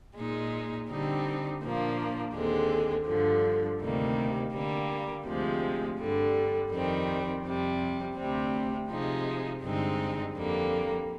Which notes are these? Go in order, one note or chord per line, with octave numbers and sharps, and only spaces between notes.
A#2 G#3 D#4
D3 G3 C4 D#4
A#2 F3 A#3 D4
D#2 D3 G#3 C4
G2 D3 F3
D2 C3 D#3 G3 A#3
D3 G3 A#3
D2 C3 F3 G#3
G2 D3 G3
F2 D#3 G3 C4
F2 C3 G3
D2 C3 G3 C4
C3 F3 G#3 D#4
G2 D3 G#3 C4 D#4
F2 D3 G3 A#3